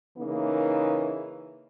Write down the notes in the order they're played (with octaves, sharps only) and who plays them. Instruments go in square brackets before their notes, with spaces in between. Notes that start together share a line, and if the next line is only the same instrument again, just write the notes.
[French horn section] C#3 E3 A#3 D#4